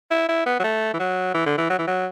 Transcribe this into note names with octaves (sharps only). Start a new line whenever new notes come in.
E4
E4
B3
F#3
A3
E3
F#3
E3
D3
E3
F#3
E3
F#3